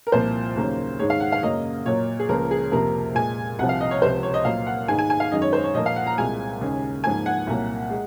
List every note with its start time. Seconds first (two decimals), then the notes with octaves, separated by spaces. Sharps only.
0.07 A#4
0.12 C2 A#2 F3 A#3 C5
0.56 D#2 C#3 F#3 A#3
0.99 G#2 D#3 G#3 C#5
1.10 F5
1.20 F#5
1.32 F5
1.43 F#2 C#3 F#3 A#3 D#5
1.86 A#2 F#3 A#3 C#5
2.20 G#4
2.29 C#2 C#3 F3 A#3 A#4
2.51 G#4
2.72 F2 C3 F3 A#3 A#4
3.15 A#2 G#3 G#5
3.59 C2 C3 F3 F#5
3.69 F5
3.81 D#5
3.91 C#5
4.02 C#2 C3 F3 C5
4.23 C#5
4.34 D#5
4.45 A#2 F#3 A#3 F5
4.67 F#5
4.88 G#2 D#3 G#3 G#5
4.99 G#5
5.10 G#5
5.20 F5
5.32 F#2 D#3 G#3 D#5
5.42 C#5
5.53 C5
5.64 C#5
5.74 A#2 F3 A#3 D#5
5.86 F5
5.96 F#5
6.07 A#5
6.18 C2 A#2 G#3 G#5
6.61 D#2 C#3 G#3
7.04 G#2 F3 A#3 G#5
7.26 F#5
7.47 C2 A#2 F#3 A#3
7.90 G#3